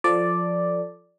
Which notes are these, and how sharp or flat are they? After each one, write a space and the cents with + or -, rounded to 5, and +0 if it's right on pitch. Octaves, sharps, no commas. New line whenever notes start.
F3 +0 A4 +5 D5 +0